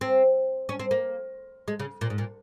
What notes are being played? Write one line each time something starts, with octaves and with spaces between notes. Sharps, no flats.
C4
C#4
C4
A#3
G#3
C#3
A#2
G#2
A#2